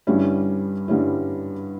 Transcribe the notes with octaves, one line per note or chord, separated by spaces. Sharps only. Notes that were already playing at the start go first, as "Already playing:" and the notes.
G2 D3 G3 C#4 E4
G2 D3 G3 C#4 E4